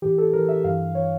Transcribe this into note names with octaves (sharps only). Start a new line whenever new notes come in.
A2 E3 G4
A4
A2 E3 A#4
E5
G2 E3 F5
E3 C#5